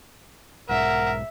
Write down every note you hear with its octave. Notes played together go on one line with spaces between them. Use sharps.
B1 G#2 A#4 E5 F#5